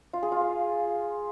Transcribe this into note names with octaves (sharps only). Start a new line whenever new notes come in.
F4
G#4
F4
F5